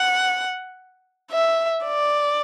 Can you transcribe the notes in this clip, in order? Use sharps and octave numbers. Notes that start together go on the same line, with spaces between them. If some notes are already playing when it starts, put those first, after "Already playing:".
Already playing: F#5
E5
D5